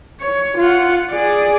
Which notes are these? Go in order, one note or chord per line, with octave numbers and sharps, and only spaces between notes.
C#5
F4 F#5
G#4 D5